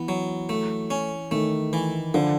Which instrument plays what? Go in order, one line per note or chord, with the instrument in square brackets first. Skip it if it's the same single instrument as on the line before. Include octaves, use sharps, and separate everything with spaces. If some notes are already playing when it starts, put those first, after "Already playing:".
Already playing: [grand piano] E3 [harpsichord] B3
[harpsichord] F#3
A3
C#4
[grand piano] D#3 [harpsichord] A3
[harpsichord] E3
[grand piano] D3 [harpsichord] F3